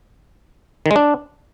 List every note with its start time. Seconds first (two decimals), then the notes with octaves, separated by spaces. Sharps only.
0.86 D#3
0.91 G#3
0.96 D4